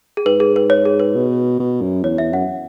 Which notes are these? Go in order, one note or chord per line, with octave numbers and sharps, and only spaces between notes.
G#4
G#2 B4
G#4
B4
C#5
G#4
B4
B2
B2
F#2
E2 C#5
E2 E5
F#2 F#5